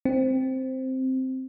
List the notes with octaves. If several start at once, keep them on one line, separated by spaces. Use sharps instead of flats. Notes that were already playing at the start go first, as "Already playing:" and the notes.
C4